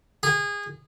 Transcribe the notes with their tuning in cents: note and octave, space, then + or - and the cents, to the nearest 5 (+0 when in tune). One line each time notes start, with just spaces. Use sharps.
G#4 -25